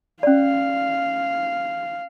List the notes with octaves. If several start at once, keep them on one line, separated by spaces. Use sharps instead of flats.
C#4 D5 F5